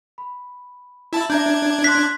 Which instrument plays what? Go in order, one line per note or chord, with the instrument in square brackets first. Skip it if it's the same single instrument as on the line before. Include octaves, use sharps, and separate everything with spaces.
[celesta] B5
[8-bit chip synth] E4 A5
[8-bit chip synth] D4 G#6 [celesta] E5 A#5 G6
[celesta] C6 F#6 [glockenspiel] B6